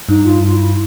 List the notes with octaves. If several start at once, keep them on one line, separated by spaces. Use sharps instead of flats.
G2 D#4
F4
E4